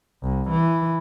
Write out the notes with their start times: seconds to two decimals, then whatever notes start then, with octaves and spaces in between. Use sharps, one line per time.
0.23 C2
0.51 E3